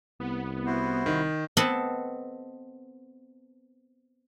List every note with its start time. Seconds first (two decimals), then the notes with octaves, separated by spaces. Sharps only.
0.20 C2 B3
0.66 E4 F#4 C5
1.06 D#3
1.57 B3 C4 A4 D#5 F#5